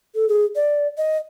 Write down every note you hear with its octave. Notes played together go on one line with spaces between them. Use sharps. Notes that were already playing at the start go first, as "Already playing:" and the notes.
A4
G#4
D5
D#5